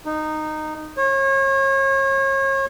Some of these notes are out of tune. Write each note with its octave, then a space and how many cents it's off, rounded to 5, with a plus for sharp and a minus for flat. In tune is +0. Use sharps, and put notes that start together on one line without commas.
D#4 -15
C#5 -35